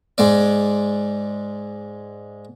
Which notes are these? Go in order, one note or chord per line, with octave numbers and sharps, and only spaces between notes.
G#2 G#3 D5